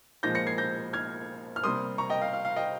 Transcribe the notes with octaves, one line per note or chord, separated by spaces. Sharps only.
A#2 F3 G#3 G6 A#6
A#6 C#7
G#6 C7
G6 A#6
F6 G#6
F6
C3 G3 A#3 C6 D#6
A#5 C#6
D#5 G5
F5
F5
F5
D#5 G5